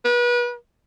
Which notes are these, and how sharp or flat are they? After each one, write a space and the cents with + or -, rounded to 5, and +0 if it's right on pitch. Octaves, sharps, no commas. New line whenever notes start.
B4 -35